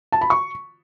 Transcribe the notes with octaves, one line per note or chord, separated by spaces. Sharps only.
A5
B5
C#6